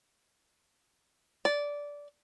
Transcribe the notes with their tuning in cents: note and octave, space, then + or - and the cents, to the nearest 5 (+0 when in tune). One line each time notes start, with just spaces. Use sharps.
D5 -15